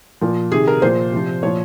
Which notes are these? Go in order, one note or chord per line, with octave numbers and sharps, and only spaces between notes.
A#2 F3
C3 D#3 G#4
A#4
A#2 F3 C5
C3 F3
A#2 F3 C#5